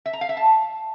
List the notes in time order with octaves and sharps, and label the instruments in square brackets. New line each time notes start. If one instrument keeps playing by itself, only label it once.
[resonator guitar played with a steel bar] E5
A#5
F5
E5
A5